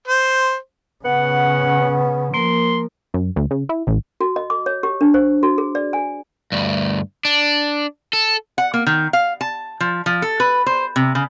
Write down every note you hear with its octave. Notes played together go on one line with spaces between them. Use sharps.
C5
C#3 B3 C#4 F#5
F3 A#3 A#4 C6
F#2
D2
C#3
E4
A1
F#4
D#5
D6
C#5
G4
D4
C5
F#4
G#4
D5
G#5
D2 G2
D4
A4
F#5
A#3
D#3
F5
A5
F3
F3
A4
B4
C5
C3
C#3